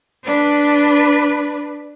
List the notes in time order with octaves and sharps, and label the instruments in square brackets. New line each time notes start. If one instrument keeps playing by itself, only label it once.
[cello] D4 B4